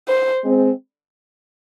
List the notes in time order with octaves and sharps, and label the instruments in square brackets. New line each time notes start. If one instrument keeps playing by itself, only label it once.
[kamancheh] C5
[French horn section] G#3 C4